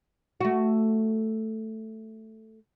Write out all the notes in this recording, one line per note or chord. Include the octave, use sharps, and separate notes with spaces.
A3 F#4